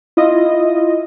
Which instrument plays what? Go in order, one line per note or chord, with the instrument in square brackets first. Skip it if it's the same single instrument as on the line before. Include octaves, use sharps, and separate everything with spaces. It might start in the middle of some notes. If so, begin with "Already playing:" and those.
[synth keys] E4 F4 D#5